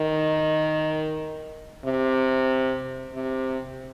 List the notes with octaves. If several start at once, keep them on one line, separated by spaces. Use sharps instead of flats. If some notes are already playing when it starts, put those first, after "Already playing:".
Already playing: D#3
C3
C3